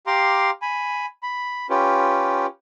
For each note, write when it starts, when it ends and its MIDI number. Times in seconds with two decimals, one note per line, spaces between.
0.07 0.50 67
0.07 0.50 77
0.07 0.50 82
0.07 0.50 84
0.07 0.50 86
0.62 1.06 80
0.62 1.06 83
1.23 1.67 83
1.70 2.46 61
1.70 2.46 65
1.70 2.46 67
1.70 2.46 71